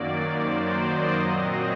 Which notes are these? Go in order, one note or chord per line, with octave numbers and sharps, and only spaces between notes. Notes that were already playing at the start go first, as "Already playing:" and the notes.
Already playing: F#2 D#3 F#3 A#3 D5
C5
D#5
A#2 F#3 C4